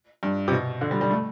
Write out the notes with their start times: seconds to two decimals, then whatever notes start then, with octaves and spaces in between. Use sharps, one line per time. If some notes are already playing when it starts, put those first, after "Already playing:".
0.23 G2
0.48 C3
0.52 B2
0.81 D3
0.91 G3
1.01 G3
1.11 A3